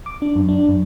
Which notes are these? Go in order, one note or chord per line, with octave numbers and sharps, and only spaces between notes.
D6
D4
F#2
D4
F#2